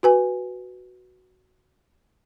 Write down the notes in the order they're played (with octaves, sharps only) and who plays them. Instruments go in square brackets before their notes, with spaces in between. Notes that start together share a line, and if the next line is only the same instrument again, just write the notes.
[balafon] F#4 B4 G#5